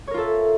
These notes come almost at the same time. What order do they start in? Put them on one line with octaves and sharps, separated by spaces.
C#5 A#4 F4 A4 E5